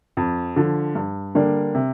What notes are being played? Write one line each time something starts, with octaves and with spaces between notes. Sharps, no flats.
F2
D3 F3
G2
D3 G3 A#3 D4
C3